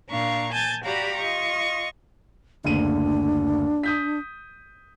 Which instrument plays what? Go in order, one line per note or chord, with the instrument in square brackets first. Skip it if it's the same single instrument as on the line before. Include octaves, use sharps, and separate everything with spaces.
[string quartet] A#2 D4 F5 A#5 C#6
G#5 A5 G6 A6
F#4 G4 D5 F5 A#5 B5
F4 D#5 C#6
[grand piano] F#1 D2 D#7 [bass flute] D4
[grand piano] D#6 G6 B6